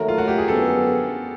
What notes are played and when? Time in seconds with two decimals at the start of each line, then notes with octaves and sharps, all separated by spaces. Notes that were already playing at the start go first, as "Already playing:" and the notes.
Already playing: D#2 D#3 F#3 A3 A#4
0.08 F4
0.18 F#4
0.28 G4
0.38 G#4
0.47 F#2 D3 F3 G#3 B3 A4